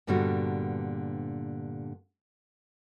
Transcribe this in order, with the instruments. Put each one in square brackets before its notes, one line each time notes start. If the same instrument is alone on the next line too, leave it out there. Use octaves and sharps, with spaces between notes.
[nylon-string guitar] G2 A#2 D3 G3 B3 F#4